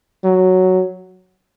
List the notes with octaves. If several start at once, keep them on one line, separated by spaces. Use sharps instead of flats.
F#3